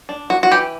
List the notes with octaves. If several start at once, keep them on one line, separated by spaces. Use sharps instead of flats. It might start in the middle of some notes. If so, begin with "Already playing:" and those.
D4
F#4
F#4
E3 G4